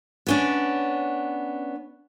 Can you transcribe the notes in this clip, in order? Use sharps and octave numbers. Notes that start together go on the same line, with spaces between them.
B3 C#4 D4